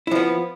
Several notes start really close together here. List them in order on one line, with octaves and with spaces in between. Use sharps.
E4 F3 B3